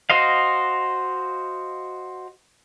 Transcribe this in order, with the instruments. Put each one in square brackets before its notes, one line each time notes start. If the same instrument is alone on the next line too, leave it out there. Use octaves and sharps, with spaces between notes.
[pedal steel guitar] F#4 C5 D#5 F5